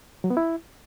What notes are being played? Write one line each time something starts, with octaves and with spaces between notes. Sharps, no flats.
F#3
B3
E4